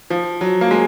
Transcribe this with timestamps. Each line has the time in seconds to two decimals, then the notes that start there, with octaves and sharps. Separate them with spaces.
0.10 F3
0.41 F#3
0.61 A#3
0.71 G#3